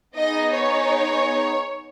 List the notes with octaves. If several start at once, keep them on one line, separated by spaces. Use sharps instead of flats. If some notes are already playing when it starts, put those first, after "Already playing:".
B3 D#4 G#4 D#5
C#5